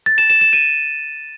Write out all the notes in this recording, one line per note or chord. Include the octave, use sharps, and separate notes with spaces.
A6
E7
E7
E7
D#7